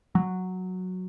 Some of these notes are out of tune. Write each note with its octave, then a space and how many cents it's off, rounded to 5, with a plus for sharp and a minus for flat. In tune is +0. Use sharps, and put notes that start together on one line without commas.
F#3 -5